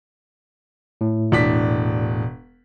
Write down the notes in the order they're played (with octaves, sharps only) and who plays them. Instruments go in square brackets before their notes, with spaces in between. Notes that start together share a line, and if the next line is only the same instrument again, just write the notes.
[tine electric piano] A2
[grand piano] E1 D4 B6